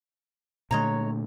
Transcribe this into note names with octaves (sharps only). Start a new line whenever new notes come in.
A#2 D3 G#3 A3 C#5 A#5